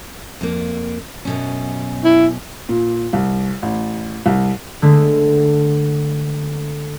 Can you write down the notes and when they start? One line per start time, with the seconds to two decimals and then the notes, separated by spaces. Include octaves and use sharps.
0.41 F2 A#3
1.25 F#2 B2 C#4
2.04 E4
2.69 A#2
3.13 C2
3.62 A1
4.26 C2
4.82 D3 G#3 A3 B3